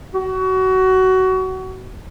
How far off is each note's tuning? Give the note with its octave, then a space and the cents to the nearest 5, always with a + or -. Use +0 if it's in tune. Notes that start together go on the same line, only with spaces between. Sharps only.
F#4 +25